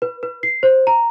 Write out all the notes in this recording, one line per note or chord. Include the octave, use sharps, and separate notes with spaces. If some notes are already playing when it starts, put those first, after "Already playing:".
B4
B4
C7
C5
A#5